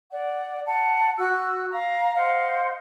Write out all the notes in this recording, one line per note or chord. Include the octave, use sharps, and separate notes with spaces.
D5 F#5
F#5 A5
F#4 E6 F#6
F5 A#5
C5 D#5 F5 F#5